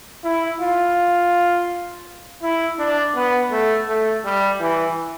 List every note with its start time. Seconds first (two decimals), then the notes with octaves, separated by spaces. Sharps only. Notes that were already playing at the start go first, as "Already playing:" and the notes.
0.24 E4
0.61 F4
2.43 E4
2.79 D4
3.15 B3
3.51 A3
3.88 A3
4.25 G3
4.60 E3